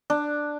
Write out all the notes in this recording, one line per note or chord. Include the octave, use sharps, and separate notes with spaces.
D4